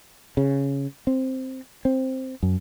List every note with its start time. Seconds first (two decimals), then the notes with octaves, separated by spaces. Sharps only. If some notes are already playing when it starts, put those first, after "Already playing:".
0.37 C#3
1.07 C4
1.85 C4
2.43 F#2